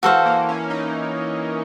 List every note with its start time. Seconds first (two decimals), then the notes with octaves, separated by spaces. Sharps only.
0.03 E3 F#4 A4 C5 F5
0.26 A#3
0.49 C#4
0.70 D#4